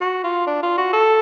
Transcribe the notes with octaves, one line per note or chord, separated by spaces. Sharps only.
F#4
F4
D4
F4
F#4
A4